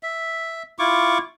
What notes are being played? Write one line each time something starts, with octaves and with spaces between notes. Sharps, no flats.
E5
E4 F4 C#6 D6